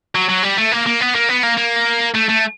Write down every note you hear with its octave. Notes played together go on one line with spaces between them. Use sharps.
F#3
F#3
G3
A3
A#3
A#3
B3
A#3
B3
A#3
A#3
A3
A3